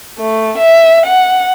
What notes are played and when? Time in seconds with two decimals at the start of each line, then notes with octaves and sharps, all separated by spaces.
0.18 A3
0.58 E5
1.06 F#5